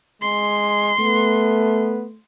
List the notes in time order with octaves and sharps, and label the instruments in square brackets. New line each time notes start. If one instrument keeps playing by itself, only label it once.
[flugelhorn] G#3 [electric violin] C6
[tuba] A3 [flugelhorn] B3